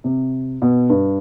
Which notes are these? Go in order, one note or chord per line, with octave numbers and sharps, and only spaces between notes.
C3
B2
G2